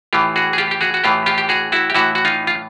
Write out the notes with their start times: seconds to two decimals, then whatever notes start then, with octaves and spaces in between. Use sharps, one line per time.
0.13 A2 E3 F4 G4
0.36 F#4 G#4
0.53 G#4
0.58 F4 G4
0.71 G4
0.81 F#4 G#4
0.94 F#4
1.04 A2 E3 F4 G4
1.26 F4 G4
1.38 G4
1.49 F#4 G#4
1.72 E4 F#4
1.90 G4
1.94 A2 E3 E4 F#4
2.15 F#4
2.25 D#4 F4
2.47 F4